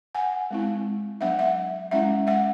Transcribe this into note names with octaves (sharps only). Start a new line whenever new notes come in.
F#5 G#5
G#3 C4 E4
F#3 B3 D4 E5 F#5
E5 F#5
G#3 C#4 E4 E5 F#5
E5 F#5